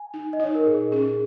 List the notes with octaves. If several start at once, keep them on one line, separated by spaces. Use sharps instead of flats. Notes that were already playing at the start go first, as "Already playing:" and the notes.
Already playing: G#5
D#4
D#5
D#4 C#5
A#4
A#2 G#4
C#4 G#4